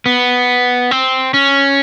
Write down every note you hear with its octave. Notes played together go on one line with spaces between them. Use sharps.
B3
C4
C#4